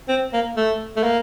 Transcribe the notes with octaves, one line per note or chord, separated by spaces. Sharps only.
C4
A#3
A3
A3
A#3